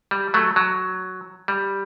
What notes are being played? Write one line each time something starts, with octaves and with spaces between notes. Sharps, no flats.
G3
F#3 A3
F#3
G3